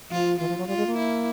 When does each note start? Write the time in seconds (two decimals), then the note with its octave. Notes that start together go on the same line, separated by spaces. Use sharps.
0.10 F3 F4
0.39 E3 F4
0.49 F3
0.58 F#3
0.67 G3 F4
0.77 G#3
0.87 A#3
0.97 E4